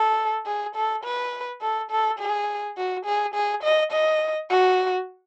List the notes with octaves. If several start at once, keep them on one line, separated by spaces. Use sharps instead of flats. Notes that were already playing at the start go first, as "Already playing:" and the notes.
Already playing: A4
G#4
A4
B4
A4
A4
G#4
F#4
G#4
G#4
D#5
D#5
F#4